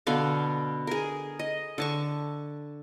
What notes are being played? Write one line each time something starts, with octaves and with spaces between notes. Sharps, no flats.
B2 D3 B3 F5
G#4 A#4
D#5
D3 A5 C#6